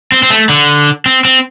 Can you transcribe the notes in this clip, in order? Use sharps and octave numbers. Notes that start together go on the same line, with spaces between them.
C4
C4
A3
D3
C4
C4